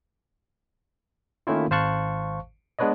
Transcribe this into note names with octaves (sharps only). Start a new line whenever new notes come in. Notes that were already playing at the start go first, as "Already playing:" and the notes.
D#3 A3 A#3 C#4 E4 F4
G#1 C5 F5 A5 C#6 F#6
G#3 B3 D4 B4 C#5 D#5